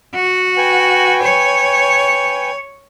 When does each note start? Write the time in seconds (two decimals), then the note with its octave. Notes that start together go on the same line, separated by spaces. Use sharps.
0.15 F#4
0.57 B4 G5 G#5
1.22 C#5